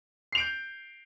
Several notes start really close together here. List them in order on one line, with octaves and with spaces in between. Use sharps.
C7 F7 D7 G6